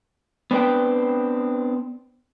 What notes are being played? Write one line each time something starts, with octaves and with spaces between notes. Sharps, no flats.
B3 C4 D4 B4 G5